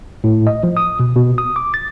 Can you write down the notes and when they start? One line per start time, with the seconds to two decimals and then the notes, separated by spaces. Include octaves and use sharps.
0.24 A2
0.47 D#5
0.63 F3
0.77 D#6
1.00 B2
1.16 B2
1.38 D#6
1.56 D6
1.74 A6